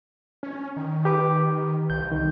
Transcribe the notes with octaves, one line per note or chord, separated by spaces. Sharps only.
C#4
D#3
G4 B4 D6
C2 G6
D#3